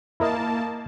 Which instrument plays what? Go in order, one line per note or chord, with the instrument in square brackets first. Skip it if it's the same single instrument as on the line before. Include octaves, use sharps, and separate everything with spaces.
[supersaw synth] A#3 A5 [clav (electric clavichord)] E4 A#4 D#5